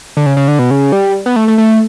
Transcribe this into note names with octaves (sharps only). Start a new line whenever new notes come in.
D3
C#3
C#3
D3
B2
C#3
G3
B3
A3
A3
A3